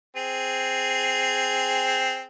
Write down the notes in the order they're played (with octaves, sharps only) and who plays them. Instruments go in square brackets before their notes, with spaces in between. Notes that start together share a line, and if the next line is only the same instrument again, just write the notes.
[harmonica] C4 G#4